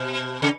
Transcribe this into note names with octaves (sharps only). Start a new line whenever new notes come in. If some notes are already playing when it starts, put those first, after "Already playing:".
Already playing: B2
C#3